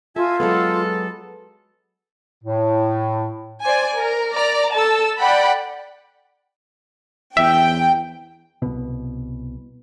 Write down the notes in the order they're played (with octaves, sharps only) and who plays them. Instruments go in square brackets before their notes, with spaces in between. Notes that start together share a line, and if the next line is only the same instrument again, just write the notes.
[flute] F4 [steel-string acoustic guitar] A4 [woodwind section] D#5 E5 G#5
[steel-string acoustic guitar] F#3 G#3 B3 [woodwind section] A4
[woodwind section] A2
[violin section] C5 D5 G#5
A#4
D5 A#5
A4 A5 E6
D5 F#5 G5 B5
[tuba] E2 [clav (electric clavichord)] E5 [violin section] G5
[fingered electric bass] C2 B2